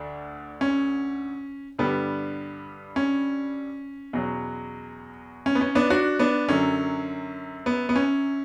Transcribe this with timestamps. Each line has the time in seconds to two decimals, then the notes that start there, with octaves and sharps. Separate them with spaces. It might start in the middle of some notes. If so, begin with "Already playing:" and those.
Already playing: D2 D3 D4
0.61 C#4
1.79 G2 D3 G3 B3
2.96 C#4
4.13 E2 B2 F#3
5.46 C#4
5.55 B3
5.61 C#4
5.75 B3 D4
5.90 D4 F#4
6.19 B3 D4
6.48 F#2 D3 F#3 C#4
7.66 B3
7.89 B3
7.96 C#4